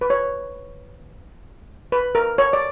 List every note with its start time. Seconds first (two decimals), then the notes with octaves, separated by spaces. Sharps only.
0.01 B4
0.10 C#5
1.92 B4
2.15 A#4
2.38 C#5
2.53 D5